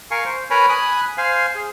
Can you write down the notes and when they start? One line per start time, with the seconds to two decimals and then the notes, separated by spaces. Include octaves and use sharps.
0.11 A#4 F5 G#5 C#6
0.25 C5
0.50 A#4 B4 C#5 G#5 A#5 B5
0.69 G#5 B5 D#6 F#6
1.18 C5 F5 G#5
1.55 G#4